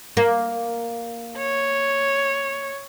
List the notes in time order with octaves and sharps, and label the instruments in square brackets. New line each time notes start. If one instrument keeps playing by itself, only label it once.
[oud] A#3
[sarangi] C#5